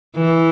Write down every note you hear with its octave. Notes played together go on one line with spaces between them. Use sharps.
E3